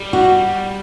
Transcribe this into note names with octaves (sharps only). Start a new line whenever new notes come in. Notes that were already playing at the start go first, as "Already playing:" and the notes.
Already playing: G3
F#4